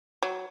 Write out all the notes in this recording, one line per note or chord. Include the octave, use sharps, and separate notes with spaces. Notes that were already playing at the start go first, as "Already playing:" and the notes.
F#3